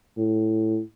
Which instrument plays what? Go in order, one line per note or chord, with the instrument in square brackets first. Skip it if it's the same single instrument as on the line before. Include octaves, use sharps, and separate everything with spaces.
[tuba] A2